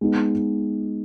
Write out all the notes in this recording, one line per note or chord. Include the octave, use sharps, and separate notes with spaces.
G#3 B3 D#4